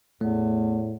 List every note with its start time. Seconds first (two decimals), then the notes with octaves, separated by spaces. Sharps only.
0.21 E2 A2 A3